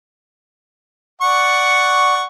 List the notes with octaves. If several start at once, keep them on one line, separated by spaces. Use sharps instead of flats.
D5 F#5 C#6